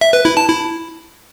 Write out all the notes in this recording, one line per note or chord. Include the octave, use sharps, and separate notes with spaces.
E5
B4
E4
A5
E4